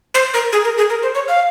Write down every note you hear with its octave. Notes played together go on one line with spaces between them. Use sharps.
C5
A#4
G#4
A#4
G#4
A#4
C5
C#5
F5